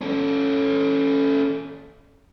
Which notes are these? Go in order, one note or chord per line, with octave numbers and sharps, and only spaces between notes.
C#4 A4